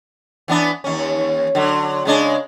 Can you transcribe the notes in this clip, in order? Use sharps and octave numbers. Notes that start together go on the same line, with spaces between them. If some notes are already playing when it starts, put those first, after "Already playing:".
E3 B3 D4
D#2 C#4
D3 F#3
C#3 G#3 D4